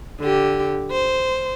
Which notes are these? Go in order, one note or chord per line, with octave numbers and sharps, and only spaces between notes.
D3 G4
C5